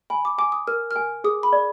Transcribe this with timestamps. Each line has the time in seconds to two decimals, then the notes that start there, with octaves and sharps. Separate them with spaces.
0.10 G#5 B5
0.25 D6
0.38 G#5 D6
0.52 D#6
0.67 A#4 F6
0.91 F6
0.96 G#5
1.24 G#4 D#6
1.43 B5
1.53 D5